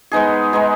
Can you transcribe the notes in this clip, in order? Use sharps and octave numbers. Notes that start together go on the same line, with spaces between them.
G#3 B3 D#4 G#4
G#3 B3 D#4 G#4